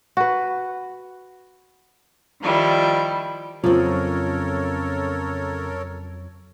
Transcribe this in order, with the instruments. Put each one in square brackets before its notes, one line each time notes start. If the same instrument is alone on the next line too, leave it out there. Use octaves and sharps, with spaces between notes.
[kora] F#4 B4
[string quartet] D#3 F3 G3 E4
[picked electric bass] F2 F#3 [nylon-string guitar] C#3 C4 [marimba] F4 [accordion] A4 A#4 C#5